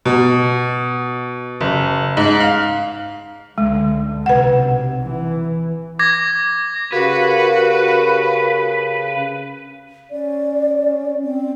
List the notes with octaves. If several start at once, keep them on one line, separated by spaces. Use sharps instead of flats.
B2
F#1
G#2
F5
C#2 D3 G#3
B1 C3 B4 F#5
E3
D6 G#6 A#6
C#3 F#4 G4 A#4 B4 F5
C#4 D5
C4